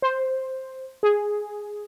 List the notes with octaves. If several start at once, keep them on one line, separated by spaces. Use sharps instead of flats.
C5
G#4